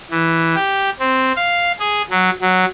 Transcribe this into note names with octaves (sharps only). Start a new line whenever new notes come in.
E3
G4
C4
F5
G#4
F#3
F#3